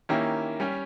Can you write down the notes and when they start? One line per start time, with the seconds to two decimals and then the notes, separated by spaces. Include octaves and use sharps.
0.09 D#3 A#3 C#4 E4 G4
0.60 G3 C#4 G4